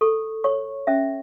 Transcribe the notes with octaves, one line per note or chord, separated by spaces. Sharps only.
A4 C#6
C#5 C#6
C#4 E5